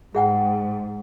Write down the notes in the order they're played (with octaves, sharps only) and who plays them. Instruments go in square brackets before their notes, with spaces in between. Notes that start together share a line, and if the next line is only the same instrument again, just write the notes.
[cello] G#2 [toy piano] G#4 F#5 G5